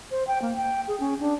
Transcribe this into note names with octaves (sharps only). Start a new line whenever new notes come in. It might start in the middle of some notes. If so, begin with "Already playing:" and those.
C5
G5
A#3
G5
G#4
C#4
D4